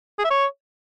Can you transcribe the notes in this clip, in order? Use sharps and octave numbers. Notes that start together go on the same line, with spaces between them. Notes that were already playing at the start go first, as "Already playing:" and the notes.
G#4
E5
C#5